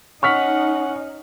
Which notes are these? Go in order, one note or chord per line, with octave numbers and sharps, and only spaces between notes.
C#4 D#4 F#5 C#6 F6 B6